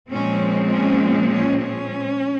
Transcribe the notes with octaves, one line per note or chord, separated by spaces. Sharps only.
A#2 F3 G#3 C4 C#4
C#4
C#4
C#4